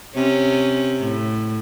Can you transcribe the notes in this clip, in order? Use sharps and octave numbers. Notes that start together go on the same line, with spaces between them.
C3 C#4
A2